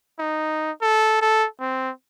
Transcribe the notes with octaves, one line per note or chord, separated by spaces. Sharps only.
D#4
A4
A4
C4